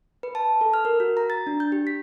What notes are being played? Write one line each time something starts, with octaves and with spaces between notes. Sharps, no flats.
B4
A5
A4
F6
A#4
F#4
A#5
A6
D4
G6
G4
B6